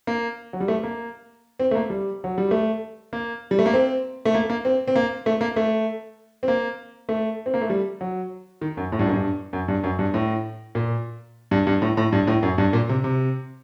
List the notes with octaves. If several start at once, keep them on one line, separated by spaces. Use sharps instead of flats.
A#3
F#3
G3
A3
A#3
C4
A3
A#3
G3
F#3
G3
A3
A#3
G3
A3
A#3
C4
A3
A#3
A#3
C4
C4
A#3
A3
A#3
A3
C4
A#3
A3
C4
A#3
A3
G3
F#3
D#3
F#2
A2
G2
F#2
G2
F#2
G2
F#2
G2
A2
A#2
G2
G2
A2
A2
G2
A2
F#2
G2
A#2
C3
C3